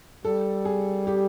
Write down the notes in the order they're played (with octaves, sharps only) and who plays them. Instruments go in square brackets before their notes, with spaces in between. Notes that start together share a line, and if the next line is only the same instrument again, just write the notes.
[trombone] G3 [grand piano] A4
[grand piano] G#4
G4